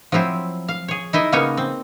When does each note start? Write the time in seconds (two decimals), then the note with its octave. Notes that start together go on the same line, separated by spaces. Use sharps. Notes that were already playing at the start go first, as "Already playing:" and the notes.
0.12 F3 F#3 C4 E4
0.68 F5
0.88 G#4 C#5
1.13 D#4 E4 D#5 E5
1.32 C#3 A#3 B3 C#4 D#4 C#5
1.57 C4